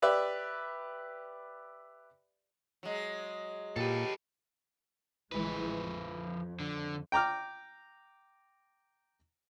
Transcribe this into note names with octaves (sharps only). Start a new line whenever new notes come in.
G4 B4 D5 E5
F#3 G#3
A#2 G4 A4 B4
A1 E3 F3 G#3 B4
F2
D3
G5 A#5 D6 F6